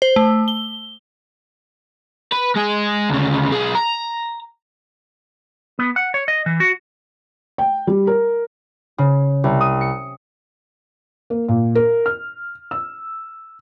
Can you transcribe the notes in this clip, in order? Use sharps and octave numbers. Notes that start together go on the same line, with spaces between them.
C5
A3
G7
B4
G#3 G#4
D2 C#3
B1 G#4
A#5
B3
F#5
C#5
D#5
E3
F#4
G5
G3
A#4
C#3
C2
D#6
C#7
A#3
A#2
A#4
F6
E6